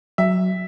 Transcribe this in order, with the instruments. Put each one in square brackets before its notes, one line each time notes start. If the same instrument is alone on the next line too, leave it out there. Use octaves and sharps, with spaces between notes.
[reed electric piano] F#3 [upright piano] E5